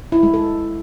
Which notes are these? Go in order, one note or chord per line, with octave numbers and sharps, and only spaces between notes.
E4
G#3
A4